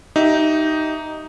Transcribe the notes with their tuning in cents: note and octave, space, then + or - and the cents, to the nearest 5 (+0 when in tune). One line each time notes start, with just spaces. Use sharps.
D#4 +0 G4 -30 E5 +0